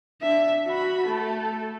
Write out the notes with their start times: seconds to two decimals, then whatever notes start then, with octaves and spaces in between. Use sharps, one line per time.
0.22 D4 E5
0.66 F#4 B5
1.07 A3 A4